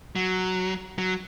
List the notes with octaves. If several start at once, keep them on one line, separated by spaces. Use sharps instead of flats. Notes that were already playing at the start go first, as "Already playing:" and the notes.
F#3
F#3